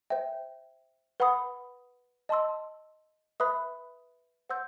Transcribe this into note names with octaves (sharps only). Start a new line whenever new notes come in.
C5 E5 G5
B4 F#5 B5 D#6
D#5 A5 C6 E6
B4 E5 B5 D#6 F#6
C5 F#5 C6 E6 G6